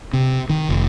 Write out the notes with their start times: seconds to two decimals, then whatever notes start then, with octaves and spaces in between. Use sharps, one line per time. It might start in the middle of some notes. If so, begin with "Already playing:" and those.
0.13 C3
0.50 D#3
0.69 F1